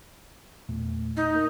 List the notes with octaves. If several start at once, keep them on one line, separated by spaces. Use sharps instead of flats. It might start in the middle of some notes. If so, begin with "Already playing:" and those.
E2 A#2 A3
D#4
A#3 A#4